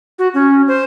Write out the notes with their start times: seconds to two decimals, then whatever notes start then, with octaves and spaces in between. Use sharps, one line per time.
0.19 F#4
0.34 C#4
0.68 C5